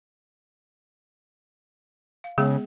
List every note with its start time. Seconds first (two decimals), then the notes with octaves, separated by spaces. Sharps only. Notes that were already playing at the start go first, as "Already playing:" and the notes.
2.24 F5
2.38 C#3 G#3 B3 G#4